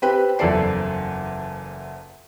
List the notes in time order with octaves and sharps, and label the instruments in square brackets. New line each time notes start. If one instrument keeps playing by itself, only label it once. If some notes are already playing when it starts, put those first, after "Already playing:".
[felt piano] C4 G4 B4
F#1 E2 F3 A4 D5 C7